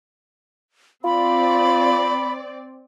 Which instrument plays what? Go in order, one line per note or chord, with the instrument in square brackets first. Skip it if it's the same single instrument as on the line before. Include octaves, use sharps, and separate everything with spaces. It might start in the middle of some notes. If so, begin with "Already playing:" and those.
[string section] C4 D5 [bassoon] F4 [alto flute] B5